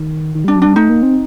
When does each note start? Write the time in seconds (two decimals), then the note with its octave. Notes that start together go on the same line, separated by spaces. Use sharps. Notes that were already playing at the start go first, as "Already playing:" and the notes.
Already playing: D#3
0.35 D#3
0.44 G3 D4
0.56 F#3
0.62 G3 D4
0.76 A3 D#4
0.89 A#3
1.03 C4